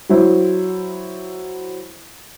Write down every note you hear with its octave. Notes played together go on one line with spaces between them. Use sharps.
F#3 E4 C5